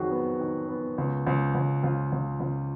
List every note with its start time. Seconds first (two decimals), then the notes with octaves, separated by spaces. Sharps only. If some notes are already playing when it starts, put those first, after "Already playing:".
Already playing: F2 D#3 F#3 F#4 G#4
0.11 B3
0.40 D#3
0.69 B3
0.98 C#2
1.27 C#2
1.55 C#2
1.83 C#2 F4
2.12 C#2
2.40 C#2